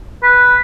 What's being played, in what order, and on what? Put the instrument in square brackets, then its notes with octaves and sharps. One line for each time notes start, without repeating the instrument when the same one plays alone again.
[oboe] B4